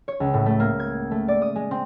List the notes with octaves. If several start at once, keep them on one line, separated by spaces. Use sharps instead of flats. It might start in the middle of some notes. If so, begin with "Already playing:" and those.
C#5
C#2
A2
A3
A#3
G#6
A3
D5
D#6
G#3
C4